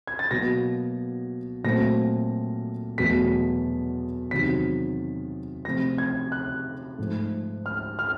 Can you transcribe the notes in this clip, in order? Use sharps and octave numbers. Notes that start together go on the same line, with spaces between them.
G#6
A6
B2 F#3 A#3 A#6
A#2 F#3 A3 C4 A#6
E2 B2 F#3 A3 B6
E2 C3 D#3 F#3 B6
C3 F3 A3 C4 A#6
G#6
F#6
G#2 F3 A3
F6
F6